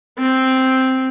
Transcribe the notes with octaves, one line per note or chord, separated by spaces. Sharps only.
C4